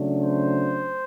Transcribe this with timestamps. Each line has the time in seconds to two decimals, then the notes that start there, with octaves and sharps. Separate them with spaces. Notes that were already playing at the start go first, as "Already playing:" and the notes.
Already playing: C#3 F#3 A3 D4
0.21 C5